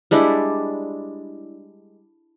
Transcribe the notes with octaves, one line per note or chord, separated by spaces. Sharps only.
G3 G#3 D4 E4